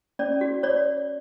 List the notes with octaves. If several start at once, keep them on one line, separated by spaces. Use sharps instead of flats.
C#4 D5
F#4
C#5 D5